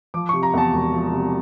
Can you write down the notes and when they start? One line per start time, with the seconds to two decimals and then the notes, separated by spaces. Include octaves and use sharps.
0.14 F3 D6
0.29 C3 C#6
0.43 A#5
0.54 E2 A5
0.73 E1
0.93 F3
1.11 C3